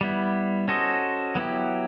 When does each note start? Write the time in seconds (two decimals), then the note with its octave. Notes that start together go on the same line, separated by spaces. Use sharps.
0.01 G3 B3 E4
0.68 C#4 F#4 A4 C5 D#5
1.35 F#3 B3 E4 G4